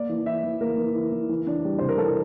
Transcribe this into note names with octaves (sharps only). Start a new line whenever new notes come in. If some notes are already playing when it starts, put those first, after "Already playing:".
Already playing: A#3 D5
E3
E4 E5
E3
A#3 A#4
E3
E4
E3
E3
D4
G3
C3 C5
A#4
E3 A4